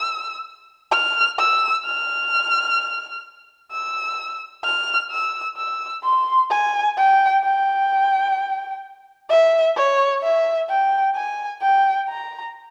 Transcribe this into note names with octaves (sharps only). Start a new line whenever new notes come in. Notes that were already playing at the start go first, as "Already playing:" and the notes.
Already playing: E6
F6
E6
F6
E6
F6
E6
E6
C6
G#5
G5
G5
E5
C#5
E5
G5
G#5
G5
A#5